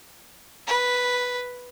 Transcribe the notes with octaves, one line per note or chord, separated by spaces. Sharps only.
B4